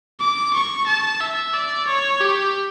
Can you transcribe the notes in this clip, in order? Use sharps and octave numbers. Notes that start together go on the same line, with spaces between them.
D6
C#6
A5
E5
D5
C#5
G4